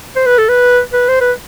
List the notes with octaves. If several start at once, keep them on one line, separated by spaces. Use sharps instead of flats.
C5
B4
A4
B4
B4
C5
B4